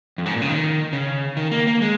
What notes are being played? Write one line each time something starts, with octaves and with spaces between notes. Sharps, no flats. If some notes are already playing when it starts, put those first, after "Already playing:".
F2
G#2
A#2
C#3
D#3
C#3
D#3
A#3
A#3
G#3